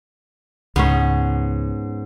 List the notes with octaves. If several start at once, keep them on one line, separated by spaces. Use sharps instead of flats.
C#2 G#2 B3 C#4